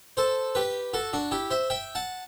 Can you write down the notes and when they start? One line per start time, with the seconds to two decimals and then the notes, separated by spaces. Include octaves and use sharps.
0.17 A4 C5
0.55 G4 B4
0.93 F#4 A4
1.13 D4 F#4
1.31 E4 G4
1.51 C5 E5
1.70 E5 G5
1.95 F#5 A5